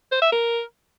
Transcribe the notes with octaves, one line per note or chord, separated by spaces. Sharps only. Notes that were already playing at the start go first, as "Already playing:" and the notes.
C5
E5
A#4